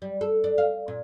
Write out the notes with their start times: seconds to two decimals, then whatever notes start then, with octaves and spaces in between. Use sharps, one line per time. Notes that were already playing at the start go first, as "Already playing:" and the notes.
0.02 G3
0.21 A4
0.44 D4
0.58 F5
0.88 A#2